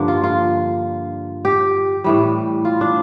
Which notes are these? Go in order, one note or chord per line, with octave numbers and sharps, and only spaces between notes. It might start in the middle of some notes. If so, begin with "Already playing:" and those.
Already playing: G2 D3 F3 A#3 D4
F4
F4
G4
A2 E3 G3
F4
D4